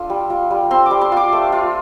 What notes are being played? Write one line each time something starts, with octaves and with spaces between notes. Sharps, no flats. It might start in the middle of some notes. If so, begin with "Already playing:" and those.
Already playing: D4 F4 A4
G3
F4
G3
C4 C6
G3 D6
C6
F4 D6
A3
F4